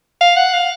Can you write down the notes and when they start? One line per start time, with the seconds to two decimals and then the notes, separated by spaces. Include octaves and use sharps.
0.21 F5
0.36 F#5
0.53 F5